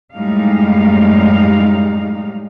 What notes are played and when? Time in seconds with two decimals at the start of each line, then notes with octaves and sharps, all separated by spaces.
0.14 F#2 A2 G3 G#3 D#4 F5